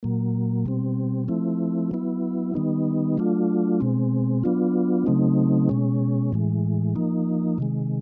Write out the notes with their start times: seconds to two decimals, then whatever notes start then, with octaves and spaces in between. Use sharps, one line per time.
0.03 A#2 F#3 A#3
0.66 B2 G3 C4
1.28 F3 A3 C4 E4
1.91 F#3 B3 E4
2.55 D#3 G3 B3 D#4
3.17 F#3 A3 D4 F4
3.80 B2 G#3 C4
4.44 F#3 B3 D4 F4
5.06 C#3 F#3 A3 C4 D#4
5.69 B2 G#3 C#4
6.33 A2 E3 G#3
6.96 F3 A#3 D#4
7.58 C3 D#3 G#3